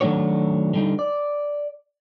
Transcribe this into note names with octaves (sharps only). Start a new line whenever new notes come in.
D#3 F#3 A3 D4 F#4 C#5
D3 G3 D#4
D5